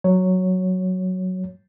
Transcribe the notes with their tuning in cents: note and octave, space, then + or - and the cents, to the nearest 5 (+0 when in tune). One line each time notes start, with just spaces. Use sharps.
F#3 +0 C#5 +0